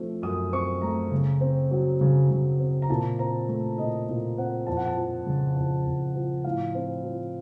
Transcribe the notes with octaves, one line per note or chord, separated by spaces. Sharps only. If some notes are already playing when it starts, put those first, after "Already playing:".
Already playing: F3 A3 C4
F#2 D#6
C4 C#6
A3 A#5
C#3
C4
F#3
C#3
C#3
C4
A#5
A#2 A5
C4 A#5
A3
A#2 D#5
A#2
C4 F#5
F2 A5
F#5
A5
F3
C#3
F2
F2
F3
A2 F5
C4
F3